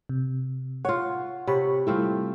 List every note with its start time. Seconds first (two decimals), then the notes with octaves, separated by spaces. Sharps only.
0.09 C3
0.85 F4 C#5 F#5
1.47 C3 C#5 B5 C#6
1.87 G3 A3 C4 E4 F4